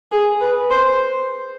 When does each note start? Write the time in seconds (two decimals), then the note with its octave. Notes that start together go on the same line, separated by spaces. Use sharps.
0.12 G#4
0.41 B4
0.71 C5